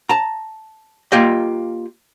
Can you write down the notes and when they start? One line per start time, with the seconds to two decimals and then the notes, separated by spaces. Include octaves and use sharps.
0.09 A5 A#5
1.12 A#3 F4 G4 D#5